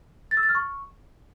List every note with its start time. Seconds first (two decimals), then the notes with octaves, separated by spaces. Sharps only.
0.31 A6
0.37 E6
0.43 A6
0.49 F6
0.55 C#6